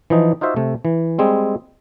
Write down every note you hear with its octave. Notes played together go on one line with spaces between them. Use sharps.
E3 F3 D#4
D#4 F4 F#4 C5 E5
C3 A3
E3
G3 G#3 C4 G#4